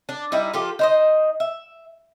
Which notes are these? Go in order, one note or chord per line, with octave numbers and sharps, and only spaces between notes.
D4
G3 D#4 E4
F3 F4 G4 A4
D#4 C5 D#5
E5